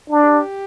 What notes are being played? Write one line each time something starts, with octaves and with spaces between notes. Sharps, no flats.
D4
G4